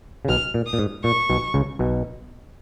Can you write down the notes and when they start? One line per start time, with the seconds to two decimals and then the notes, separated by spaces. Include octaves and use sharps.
0.25 C#3
0.29 B1 B2 F6
0.54 A#2
0.66 D#6
0.73 A#2
0.79 G#2
1.04 A#2 C#6
1.30 B1 B2
1.54 C#2 C#3
1.79 B1 B2